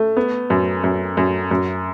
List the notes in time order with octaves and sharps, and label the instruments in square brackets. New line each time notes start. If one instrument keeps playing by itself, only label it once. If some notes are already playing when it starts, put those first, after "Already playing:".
Already playing: [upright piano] A3
B3
F#2
F#2
F#2
F#2